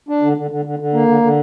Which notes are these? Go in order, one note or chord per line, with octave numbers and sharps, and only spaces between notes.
D4
D3
D3
D3
D3
D3
A#3
D3
D3